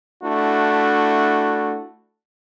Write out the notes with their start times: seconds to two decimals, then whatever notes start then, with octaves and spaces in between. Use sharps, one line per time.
0.22 A3 D4 E4 F#4